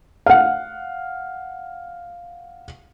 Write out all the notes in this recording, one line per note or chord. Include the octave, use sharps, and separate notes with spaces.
F5 F#5